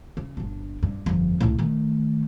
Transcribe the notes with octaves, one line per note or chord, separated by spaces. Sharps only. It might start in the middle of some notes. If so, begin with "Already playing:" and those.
C#3
G1 D4
G2
G1 F2
C#2 A2
D#3 A3